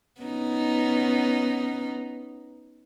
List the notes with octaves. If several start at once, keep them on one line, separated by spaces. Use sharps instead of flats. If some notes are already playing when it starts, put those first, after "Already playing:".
B3 C#4 D#4